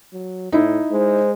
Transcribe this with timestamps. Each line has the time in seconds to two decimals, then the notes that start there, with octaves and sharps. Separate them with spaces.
0.13 F#3
0.52 A2 D#4 E4
0.92 G#3 C5